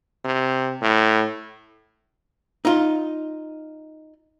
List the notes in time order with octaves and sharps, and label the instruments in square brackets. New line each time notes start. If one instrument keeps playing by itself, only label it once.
[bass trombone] C3
A2
[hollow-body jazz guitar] D#4 F4